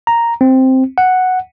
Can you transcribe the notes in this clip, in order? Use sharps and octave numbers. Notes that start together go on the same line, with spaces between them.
A#5
C4
F#5